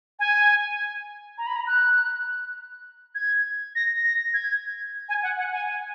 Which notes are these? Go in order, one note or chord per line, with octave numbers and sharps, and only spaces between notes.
G#5
A#5
B5
A#5
F#6
G#6
A#6
A#6
G#6
G#5
F#5
F#5
G#5